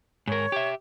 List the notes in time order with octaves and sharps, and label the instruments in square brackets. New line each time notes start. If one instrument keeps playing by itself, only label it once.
[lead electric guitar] G#2 A#4 [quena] C#5
[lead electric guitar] G4 E5